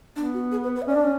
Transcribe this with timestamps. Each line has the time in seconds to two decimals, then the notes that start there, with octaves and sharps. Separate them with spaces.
0.16 B3 D4
0.34 F#4
0.52 G#4
0.63 B4
0.76 B4
0.82 E5
0.87 C#4 D5
0.95 D4
1.04 C#4